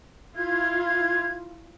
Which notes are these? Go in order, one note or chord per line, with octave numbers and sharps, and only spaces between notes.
E4 F4 G#6